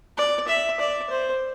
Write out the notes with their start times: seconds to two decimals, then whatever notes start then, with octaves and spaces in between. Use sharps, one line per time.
0.18 D5
0.48 E5
0.80 D5
1.10 C5